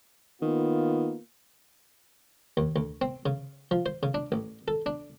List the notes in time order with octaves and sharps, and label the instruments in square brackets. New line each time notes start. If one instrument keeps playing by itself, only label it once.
[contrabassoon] D#3 [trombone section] A#3 B3 F4
[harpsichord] D#2
D2
C4
C#3
F3
C5
C#3
D4
A1
A4
D4